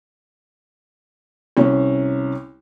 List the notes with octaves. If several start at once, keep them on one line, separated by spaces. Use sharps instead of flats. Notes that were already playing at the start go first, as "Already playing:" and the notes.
C2 C#4